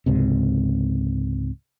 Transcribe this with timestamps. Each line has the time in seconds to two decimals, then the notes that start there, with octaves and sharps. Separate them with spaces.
0.06 C#2 G#2 C3